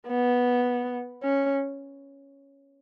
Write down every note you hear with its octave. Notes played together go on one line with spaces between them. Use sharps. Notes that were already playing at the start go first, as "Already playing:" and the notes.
B3
C#4